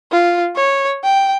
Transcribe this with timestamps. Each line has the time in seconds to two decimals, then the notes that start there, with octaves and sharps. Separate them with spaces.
0.12 F4
0.56 C#5
1.04 G5